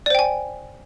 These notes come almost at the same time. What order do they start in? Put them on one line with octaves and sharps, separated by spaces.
D5 C5 G5 G#5